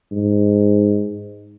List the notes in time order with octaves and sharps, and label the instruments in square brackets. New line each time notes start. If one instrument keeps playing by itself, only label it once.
[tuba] G#2